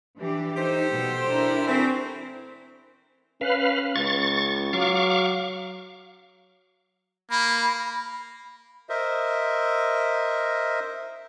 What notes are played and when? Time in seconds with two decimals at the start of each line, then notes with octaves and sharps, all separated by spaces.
0.17 E3 D4 G4
0.57 D#4 G4 A4 C5
0.91 B2 G3
1.28 D4 E4 A#4
1.67 E3 A3 C4
3.41 C#4 B4 F5
3.96 C#2 C#6 A6
4.73 F#3 F5 C#6 D6
7.31 A#3 B5
8.89 A#4 C5 D#5 E5